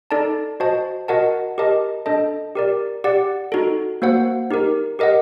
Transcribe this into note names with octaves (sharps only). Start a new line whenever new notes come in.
D#4 A4 D5 A5
F#4 C5 D#5 A5
F#4 A#4 D#5 F#5 A5
G4 A#4 D#5 A5
D4 A4 D#5 A5
G4 A#4 D5
G4 D5 F#5
D#4 F#4 A4
A#3 F#4 C5 F#5
D#4 G4 A#4
G4 A#4 D#5 F#5